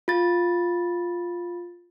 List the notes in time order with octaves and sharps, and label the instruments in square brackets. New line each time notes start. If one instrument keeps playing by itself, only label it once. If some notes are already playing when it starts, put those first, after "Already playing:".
[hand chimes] F4 A6